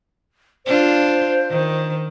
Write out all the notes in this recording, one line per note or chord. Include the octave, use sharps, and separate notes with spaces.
D4 F4 C5
D#3